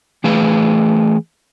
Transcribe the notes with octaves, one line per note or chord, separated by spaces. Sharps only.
E3 A3 G#4 B4 F5